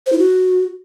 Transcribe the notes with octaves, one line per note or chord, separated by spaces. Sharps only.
C5
E4
F#4